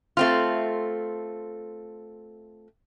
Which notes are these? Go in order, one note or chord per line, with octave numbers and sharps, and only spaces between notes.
A3 C4 F4